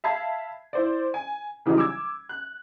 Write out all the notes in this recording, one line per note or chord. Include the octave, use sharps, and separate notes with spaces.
E5 F5 A5 B5 G#6 C7
E4 C5 D5
G#5
C#3 E3 F#3 G3 D#4
D6 E6 G#6
F#6